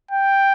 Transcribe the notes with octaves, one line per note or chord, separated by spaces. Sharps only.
G5